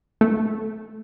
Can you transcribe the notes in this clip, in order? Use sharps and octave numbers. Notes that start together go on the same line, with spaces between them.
A3